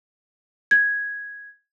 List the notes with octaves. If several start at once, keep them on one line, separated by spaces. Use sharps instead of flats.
G#6